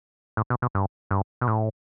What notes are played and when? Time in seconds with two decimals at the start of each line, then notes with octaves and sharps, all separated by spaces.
0.37 A2
0.50 B2
0.62 B2
0.75 G2
1.11 G2
1.41 B2
1.47 A2